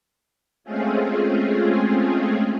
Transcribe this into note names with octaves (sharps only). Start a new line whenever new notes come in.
G#3 A3 C4 C#4 F4 G#4